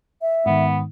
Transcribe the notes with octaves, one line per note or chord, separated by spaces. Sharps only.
E5
G#2 D#3 B3